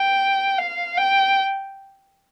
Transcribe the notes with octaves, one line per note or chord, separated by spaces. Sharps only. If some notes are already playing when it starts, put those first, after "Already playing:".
Already playing: G5
F5
G5